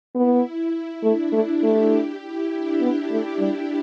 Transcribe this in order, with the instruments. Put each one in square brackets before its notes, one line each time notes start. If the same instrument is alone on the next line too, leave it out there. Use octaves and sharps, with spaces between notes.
[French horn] B3 [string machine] E4
[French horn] A3 [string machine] D4
[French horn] A3
[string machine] G4
[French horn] A3
[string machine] G4
E4
D4
[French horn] B3
A3
G3